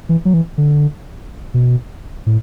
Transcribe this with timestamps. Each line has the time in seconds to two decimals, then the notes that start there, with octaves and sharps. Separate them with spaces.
0.09 E3
0.25 F#3
0.34 E3
0.58 D3
1.54 B2
2.26 A2